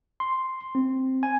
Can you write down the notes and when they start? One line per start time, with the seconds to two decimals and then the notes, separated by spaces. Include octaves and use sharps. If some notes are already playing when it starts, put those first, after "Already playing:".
0.20 C6
0.75 C4
1.23 G#5